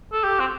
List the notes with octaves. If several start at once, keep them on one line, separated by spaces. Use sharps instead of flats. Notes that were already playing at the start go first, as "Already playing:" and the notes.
A4
G4
C4